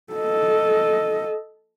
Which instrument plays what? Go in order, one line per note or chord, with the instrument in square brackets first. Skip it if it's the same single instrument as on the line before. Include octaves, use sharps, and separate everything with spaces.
[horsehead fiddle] A4 D#5